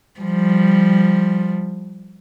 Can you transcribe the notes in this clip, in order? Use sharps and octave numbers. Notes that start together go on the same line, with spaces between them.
F3 G3